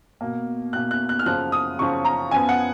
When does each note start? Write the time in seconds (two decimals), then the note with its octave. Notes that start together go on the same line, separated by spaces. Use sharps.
0.21 B2 A#3
0.73 B2 A#3 F#6
0.91 F#6
1.09 F#6
1.19 F6
1.26 F#2 C#3 F3 F#6
1.52 D#6
1.79 F#2 C#3 F3 C#6
2.05 A#5
2.31 F#2 F3 B3 G#5
2.49 F#5